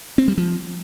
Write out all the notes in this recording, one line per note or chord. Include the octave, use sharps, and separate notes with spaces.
C4
G3
F3